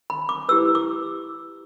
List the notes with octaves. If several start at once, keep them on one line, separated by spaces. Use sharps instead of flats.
B5
D6
E4 G4 B4 E6
D6